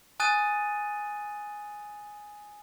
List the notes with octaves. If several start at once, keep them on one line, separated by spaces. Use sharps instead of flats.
G#5 D#6 F#6 A6 D#7